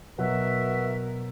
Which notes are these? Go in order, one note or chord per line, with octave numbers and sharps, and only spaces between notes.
B2 F#3 F#4 A#4 B4 E5